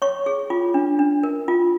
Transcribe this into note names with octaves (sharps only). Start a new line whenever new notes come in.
C#5 C#6
G#4
F4
D4
D4
A#4
F4